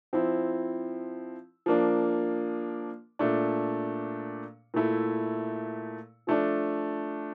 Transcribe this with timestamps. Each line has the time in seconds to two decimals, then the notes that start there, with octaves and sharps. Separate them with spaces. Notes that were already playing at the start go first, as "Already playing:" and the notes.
0.13 F3 C4 E4
1.66 F3 A#3 D4
3.19 A#2 A3 D4
4.74 A#2 A3 E4
6.27 F3 A3 D4